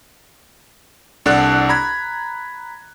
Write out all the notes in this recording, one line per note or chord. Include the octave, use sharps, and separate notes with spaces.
C2 D4 A4 D5 F#5 F#6
A#5 B5 G#6